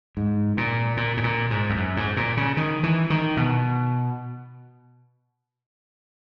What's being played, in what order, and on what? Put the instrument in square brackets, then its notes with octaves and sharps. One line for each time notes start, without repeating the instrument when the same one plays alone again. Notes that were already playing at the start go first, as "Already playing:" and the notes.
[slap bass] G#2
A#2
A#2
G#2
A#2
G#2
E2
F#2
G#2
A#2
C#3
D#3
E3
D#3
B2